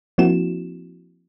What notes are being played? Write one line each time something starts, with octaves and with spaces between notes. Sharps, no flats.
F3 A#3 C4 E4 F#4 E7